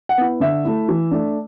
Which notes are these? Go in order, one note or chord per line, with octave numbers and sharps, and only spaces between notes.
F#5
B3 E4
D3 E5
A3 E4
E3
A3 D4